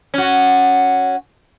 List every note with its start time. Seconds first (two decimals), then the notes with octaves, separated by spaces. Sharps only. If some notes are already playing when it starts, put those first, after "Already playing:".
0.14 C#4 F#4